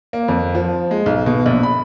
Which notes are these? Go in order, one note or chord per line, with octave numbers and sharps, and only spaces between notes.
A#3
F2
F3
G#3
B1
B2
A#1
B5